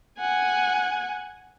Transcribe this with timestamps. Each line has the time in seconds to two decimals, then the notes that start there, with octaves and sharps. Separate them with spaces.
0.19 F#5 G#5